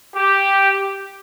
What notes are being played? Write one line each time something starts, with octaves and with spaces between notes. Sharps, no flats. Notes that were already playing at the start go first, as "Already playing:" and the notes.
G4